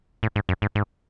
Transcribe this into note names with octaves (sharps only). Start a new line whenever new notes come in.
A2
G#2
F#2
G#2
G#2